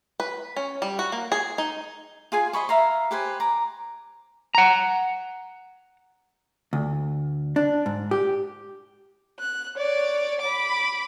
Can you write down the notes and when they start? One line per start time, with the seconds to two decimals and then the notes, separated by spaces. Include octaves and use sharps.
0.20 B4
0.56 C#4
0.82 G3
0.99 F#4
1.12 A#3
1.32 G#4
1.58 D#4
2.32 F4 G#4 G#5 C6
2.53 C5 D#5 B5 C#6
2.69 E5 F5 A#5 C6
3.11 G4 B4 C5 G#5
3.40 A#5 D6
4.55 F#5 A#5
6.73 D2
7.56 D4
7.86 G#2
8.11 G4
9.40 F#6
9.77 C#5 D5
10.42 B5 D6